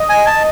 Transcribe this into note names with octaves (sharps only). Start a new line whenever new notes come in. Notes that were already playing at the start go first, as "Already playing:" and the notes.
Already playing: D#5
G#5
A5